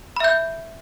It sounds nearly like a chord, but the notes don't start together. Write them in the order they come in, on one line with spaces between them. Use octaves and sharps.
B5 E5 G6